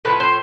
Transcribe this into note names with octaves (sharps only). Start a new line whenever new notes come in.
A2 F3 A3 B4
C5